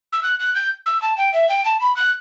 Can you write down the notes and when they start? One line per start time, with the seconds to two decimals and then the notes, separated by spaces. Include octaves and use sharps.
0.13 E6
0.23 F#6
0.39 F#6
0.55 G6
0.86 E6
1.02 A5
1.18 G5
1.33 E5
1.49 G5
1.65 A5
1.81 B5
1.96 F#6